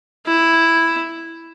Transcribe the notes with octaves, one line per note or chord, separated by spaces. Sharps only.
E4